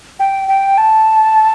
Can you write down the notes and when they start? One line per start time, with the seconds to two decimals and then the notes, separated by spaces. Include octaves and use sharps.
0.20 G5
0.49 G5
0.78 A5